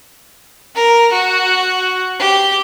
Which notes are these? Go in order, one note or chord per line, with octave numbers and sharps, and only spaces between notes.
A#4
F#4
G4